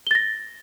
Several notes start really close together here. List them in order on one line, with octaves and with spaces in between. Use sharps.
G7 A6 A#6